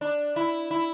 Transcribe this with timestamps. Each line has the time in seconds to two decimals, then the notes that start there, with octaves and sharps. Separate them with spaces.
0.01 D4
0.36 E4
0.71 E4